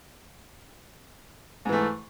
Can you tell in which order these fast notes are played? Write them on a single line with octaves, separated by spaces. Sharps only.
G#2 E3 A3